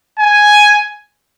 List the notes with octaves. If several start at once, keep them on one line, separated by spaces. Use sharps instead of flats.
G#5